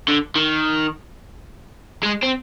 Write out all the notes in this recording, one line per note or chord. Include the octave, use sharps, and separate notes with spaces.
D3
D#3
G#3
C4